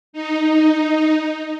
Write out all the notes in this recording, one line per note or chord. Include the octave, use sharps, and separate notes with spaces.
D#4